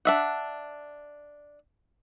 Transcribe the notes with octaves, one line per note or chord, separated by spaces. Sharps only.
D4 E5 F#5